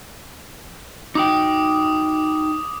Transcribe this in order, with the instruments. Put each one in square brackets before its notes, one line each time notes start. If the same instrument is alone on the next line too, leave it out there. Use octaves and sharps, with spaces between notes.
[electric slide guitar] D#4 F#4 G5 [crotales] D6 D#6